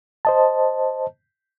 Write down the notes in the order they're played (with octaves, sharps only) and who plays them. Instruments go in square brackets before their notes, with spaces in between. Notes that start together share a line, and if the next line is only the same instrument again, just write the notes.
[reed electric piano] C5 D#5 A5